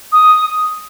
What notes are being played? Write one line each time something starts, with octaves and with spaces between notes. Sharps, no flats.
D#6